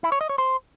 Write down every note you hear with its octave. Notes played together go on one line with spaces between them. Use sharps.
E4
C#5
D#5
C#5
C5